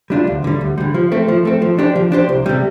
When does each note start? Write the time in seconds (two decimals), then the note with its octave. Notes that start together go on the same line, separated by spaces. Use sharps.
0.10 G3 D4 F4
0.27 D2
0.44 D3 G3
0.61 D2
0.78 D3 G3
0.94 F3
1.12 A3 C4
1.28 F3
1.45 A3 C4
1.62 F3
1.78 D4 G4 C5
1.96 F3
2.12 D4 G4 C5
2.29 C2
2.46 C3 G3